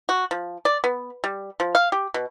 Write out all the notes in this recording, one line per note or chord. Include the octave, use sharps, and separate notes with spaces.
F#4
F3
D5
B3
G3
F3
F5
G4
B2